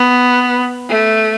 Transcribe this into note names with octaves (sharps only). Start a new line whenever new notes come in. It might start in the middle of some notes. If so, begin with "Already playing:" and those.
Already playing: B3
A3